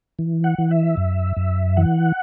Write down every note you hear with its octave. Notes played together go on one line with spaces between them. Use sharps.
E3
F#5
E3
E5
F#2
F#2
E3 F#5